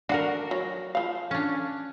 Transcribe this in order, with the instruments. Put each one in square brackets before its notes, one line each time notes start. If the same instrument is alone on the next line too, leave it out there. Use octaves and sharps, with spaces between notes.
[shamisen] D4 F#5 [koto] F#4 A#4
[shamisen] F#3
F3 F5
[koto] C#4 D4